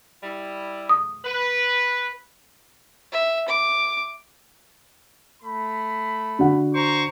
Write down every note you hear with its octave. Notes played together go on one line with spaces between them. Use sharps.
G3 E4
D#6
B4
E5
D6
A3 B5
D3 F#4 F#5
C5 A#5 C#6